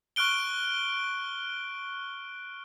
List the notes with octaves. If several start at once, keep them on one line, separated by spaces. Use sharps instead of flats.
C#6 F6 F#6 D7 G7